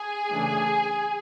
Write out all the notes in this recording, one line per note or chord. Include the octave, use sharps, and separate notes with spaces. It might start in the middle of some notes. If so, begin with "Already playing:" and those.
Already playing: G#4 G#5
C#3 E3 A3 D4